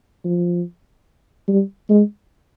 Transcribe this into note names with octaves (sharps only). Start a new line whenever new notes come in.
F3
G3
G#3